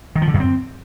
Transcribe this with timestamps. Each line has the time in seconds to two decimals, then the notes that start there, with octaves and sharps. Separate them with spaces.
0.16 D#3
0.22 F3
0.28 D3
0.34 F#2
0.40 C4